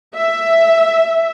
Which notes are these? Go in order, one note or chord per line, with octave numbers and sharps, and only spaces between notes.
E5